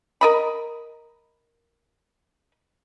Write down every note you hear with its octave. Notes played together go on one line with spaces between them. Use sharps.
A#4 D#5 B5